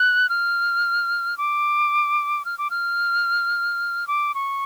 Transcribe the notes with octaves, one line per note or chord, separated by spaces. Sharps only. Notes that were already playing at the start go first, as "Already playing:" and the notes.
Already playing: F#6
F6
D6
F6
D6
F6
D6
C#6